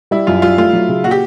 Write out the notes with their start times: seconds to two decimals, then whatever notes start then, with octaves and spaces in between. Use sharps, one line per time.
0.11 G3 E4
0.27 F#2 F4
0.42 G3 F4
0.58 A3 F4
0.73 F#3
0.88 C#3
1.04 A#2 F#4
1.11 G4